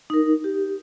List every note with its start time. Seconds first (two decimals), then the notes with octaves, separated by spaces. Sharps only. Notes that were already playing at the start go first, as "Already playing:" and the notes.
0.10 D#4 A#4
0.44 G4